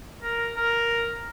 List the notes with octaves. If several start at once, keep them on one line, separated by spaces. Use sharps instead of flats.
A#4
A#4